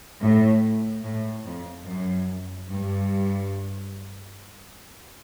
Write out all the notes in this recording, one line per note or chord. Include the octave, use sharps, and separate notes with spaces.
A2
A2
F2
F#2
G2